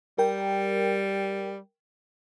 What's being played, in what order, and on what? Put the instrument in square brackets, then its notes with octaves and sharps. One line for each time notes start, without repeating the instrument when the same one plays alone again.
[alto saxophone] G3 [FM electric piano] A#4 G5